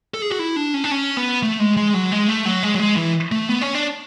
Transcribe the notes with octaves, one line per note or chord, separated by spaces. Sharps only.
A4
G#4
F#4
E4
D4
C#4
D4
C#4
B3
A3
G#3
G#3
F#3
G#3
A3
F#3
G#3
F#3
G#3
E3
A3
B3
C#4
D4